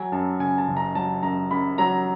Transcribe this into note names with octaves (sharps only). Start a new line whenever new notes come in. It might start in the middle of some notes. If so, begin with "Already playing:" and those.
Already playing: F#3 G#5
F#2 A5
C#3 G#5
A5
F#1
A#5
F#3 A5
F#2 A#5
F#2 B5
F#3 A#5